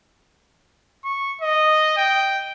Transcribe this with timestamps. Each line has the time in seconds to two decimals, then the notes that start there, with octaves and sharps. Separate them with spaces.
1.05 C#6
1.41 D#5
1.97 G5